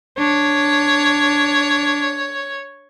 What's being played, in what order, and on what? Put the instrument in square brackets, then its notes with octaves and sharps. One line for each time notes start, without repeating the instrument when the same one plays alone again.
[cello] D4 [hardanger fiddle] C#5